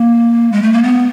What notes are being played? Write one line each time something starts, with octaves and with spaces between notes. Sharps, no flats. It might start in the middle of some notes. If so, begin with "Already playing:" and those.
Already playing: A#3
G#3
A3
A#3
B3